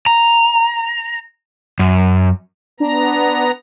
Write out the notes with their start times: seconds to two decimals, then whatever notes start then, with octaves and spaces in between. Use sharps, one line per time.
0.06 A#5
1.79 F#2
2.80 B3 D4 A#5